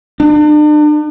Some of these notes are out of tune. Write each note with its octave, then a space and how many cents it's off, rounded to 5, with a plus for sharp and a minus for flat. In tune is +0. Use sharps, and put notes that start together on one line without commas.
D4 +40